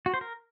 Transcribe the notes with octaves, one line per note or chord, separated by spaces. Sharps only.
F#4
C5
A#4